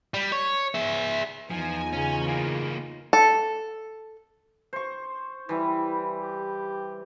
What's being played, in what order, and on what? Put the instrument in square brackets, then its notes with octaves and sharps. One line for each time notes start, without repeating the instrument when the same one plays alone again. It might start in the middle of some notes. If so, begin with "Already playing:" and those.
[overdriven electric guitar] G3
C#5
G#4 E5
[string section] E2 G#5 [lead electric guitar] F3 [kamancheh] D#4 F4
[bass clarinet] C#3 [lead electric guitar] C#4
[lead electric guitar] E3 A#3
[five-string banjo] A4
[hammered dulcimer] C5 C#6
[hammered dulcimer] E3 G3 [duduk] E4
[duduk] G4